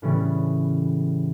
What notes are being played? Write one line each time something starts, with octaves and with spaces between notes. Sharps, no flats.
A2 C#3 E3 G3 B3 C#4